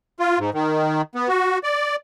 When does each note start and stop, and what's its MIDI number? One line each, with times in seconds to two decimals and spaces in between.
0.20 0.39 65
0.39 0.50 44
0.54 1.02 51
1.15 1.28 59
1.29 1.58 66
1.63 1.96 74